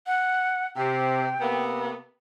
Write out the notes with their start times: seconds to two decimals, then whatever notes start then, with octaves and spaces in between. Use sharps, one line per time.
0.07 F#5
0.76 C3 G5
1.40 C3 A#3 B3